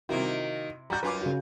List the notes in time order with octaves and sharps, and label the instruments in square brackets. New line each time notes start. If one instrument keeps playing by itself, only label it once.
[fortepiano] C3 E4 [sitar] D#3 A#3 [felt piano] F#4
[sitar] G3 F#4 [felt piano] A#5 G6
[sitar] F#2 F4 [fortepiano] B4 G#5 D6
[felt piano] C#3 F#4